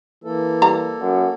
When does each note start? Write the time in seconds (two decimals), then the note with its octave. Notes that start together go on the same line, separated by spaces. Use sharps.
0.24 E3 A#3 A4
0.62 G3 F5 A#5
1.00 F#2